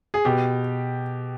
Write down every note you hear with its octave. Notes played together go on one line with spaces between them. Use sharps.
G#4
B2 G4